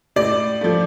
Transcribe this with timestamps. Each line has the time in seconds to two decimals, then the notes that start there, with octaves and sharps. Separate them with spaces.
0.16 A2 D5
0.61 F3 A3